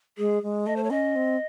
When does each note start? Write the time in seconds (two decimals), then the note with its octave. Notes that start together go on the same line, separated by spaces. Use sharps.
0.17 G#3 G#4
0.43 G#3
0.67 A3 D#5
0.76 C5
0.84 C#5
0.90 C#4 D#5
1.16 C4